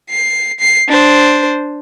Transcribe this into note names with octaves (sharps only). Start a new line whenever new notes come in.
C7
C7
D4 C5